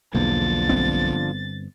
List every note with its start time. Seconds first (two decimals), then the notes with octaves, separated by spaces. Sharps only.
0.14 B1 E2 B2 D3 F3 A#3 A6
0.69 G1 B3 C4